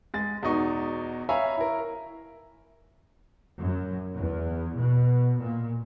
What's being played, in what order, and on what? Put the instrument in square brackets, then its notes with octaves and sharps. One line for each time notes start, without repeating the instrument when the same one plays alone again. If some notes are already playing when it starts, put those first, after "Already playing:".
[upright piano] G#3 A6
E2 B2 D#4 C#6
C#5 E5 F5 G#5 A#5 B5
E4 A#4
[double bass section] F#2
E2
B2
A#2